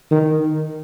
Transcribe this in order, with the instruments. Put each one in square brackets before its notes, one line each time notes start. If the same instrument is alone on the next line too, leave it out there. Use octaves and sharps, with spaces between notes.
[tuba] D#3